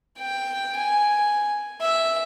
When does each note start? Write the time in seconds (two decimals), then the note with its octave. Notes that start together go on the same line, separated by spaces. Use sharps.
0.19 G5
0.77 G#5
1.81 E5